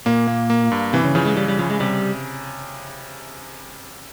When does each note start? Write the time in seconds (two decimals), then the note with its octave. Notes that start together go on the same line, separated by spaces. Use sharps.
0.06 A#2 A#3
0.27 A#3
0.50 A#3
0.72 G2
0.93 C3 E3
1.04 C#3
1.15 C#3 F3
1.26 G#3
1.37 C#3 G3
1.48 G3
1.59 C#3 F3
1.70 G#3
1.80 C3 G3